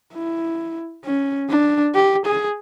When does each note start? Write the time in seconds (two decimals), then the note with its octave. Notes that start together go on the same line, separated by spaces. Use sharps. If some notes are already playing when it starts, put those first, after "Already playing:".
0.14 E4
1.04 C#4
1.50 D4
1.95 G4
2.25 G#4